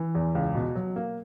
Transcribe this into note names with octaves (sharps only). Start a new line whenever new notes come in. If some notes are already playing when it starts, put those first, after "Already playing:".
Already playing: E3
E2
C#2
B2
F#3
A#3